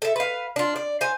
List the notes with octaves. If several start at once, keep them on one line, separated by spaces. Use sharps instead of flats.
A4 E5
B4 F5
D4 F4
D5
C5 F5 G#5